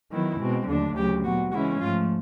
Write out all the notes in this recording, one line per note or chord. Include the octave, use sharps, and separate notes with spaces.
D#3 F#3 B3 E4
B2 G#3 C4
D#2 D3 F#3 A3 D4
D2 C#3 F#3 G4
A#2 F#3 B3 F#4
C#3 E3 G#3 C#4 E4 F#4
G#2 F3 A3 F4